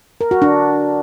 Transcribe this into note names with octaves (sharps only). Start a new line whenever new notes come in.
A#4
F#4
D4